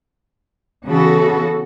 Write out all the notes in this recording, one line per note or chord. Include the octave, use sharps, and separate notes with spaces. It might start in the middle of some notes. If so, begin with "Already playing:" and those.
C#3 E3 B3 F#4 A4